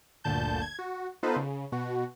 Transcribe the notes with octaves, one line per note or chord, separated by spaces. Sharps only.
G1 D2 A#2 D3 A5 G6
G#6
F#4
B3 D#4 F4 A4 B4 C5
C#3
B2 F#4